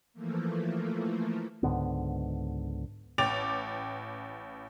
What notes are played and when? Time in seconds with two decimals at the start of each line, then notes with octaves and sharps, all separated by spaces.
0.13 E3 F3 A3 A#3
1.63 C#2 G#2 D3 B3
3.18 A1 G5 D6 A6 F7